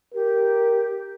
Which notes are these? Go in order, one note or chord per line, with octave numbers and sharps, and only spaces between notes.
G4 A#4